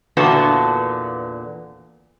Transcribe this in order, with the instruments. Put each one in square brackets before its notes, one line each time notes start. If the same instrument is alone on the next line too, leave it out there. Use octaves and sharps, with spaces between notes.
[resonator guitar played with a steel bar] E2 A#2 D3 B3 F#4 A5